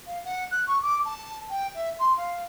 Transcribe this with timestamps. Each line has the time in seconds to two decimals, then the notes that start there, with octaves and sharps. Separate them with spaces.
0.07 F5
0.25 F#5
0.51 F#6
0.67 C#6
0.82 D6
1.05 A5
1.50 G5
1.75 E5
1.99 C6
2.17 F5